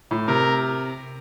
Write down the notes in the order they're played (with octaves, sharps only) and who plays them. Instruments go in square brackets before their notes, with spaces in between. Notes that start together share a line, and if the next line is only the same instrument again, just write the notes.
[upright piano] A2
[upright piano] C3 [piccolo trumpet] A#4